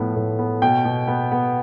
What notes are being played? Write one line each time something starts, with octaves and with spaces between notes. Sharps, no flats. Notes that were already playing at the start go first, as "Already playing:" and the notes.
Already playing: A2 F3 B3
A2
B3
B2 G5
B2
B3
B3